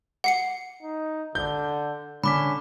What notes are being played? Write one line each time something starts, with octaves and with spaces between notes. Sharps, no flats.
F#5 C7 C#7
D#4
D3 G6
D3 C#4 B5 D6 B6